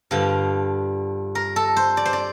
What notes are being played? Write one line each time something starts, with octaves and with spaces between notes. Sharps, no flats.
G2 D3 F3 F5
A#4
A4
C5
D5
C5
D5